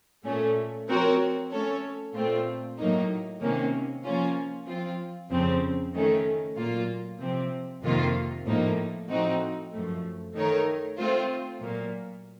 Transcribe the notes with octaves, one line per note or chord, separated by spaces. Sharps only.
A#2 A3 C#4
F3 C4 F#4 A#4 C#5
A3 C#4 A4 C#5
A#2 A3 C4 F4
A2 F#3 A#3 D#4
C3 D#3 A#3 C#4
F3 A#3 C#4 F4
F3 C4 F4
F2 C#3 F3 C4
D#3 A3 C#4
A#2 F#3 A#3 F4
C3 F3 C4
F2 C3 D#3 A#3 F4
A2 F3 A#3 D#4
A2 F3 C4 D#4 F#4
F#2 F3 A3
D#3 A3 D#4 A#4 C#5
A3 C4 F4 C5
A#2 F#3 A#3